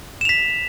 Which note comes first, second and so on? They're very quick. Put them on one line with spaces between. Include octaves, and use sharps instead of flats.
E7 F7 B6